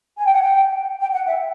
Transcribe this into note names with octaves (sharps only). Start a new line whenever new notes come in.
G#5
G5
F#5
G5
G5
F#5
E5